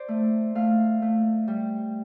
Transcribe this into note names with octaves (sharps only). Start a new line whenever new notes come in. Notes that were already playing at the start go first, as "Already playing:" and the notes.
Already playing: C5 D5
A3
A3 F5
A3
G3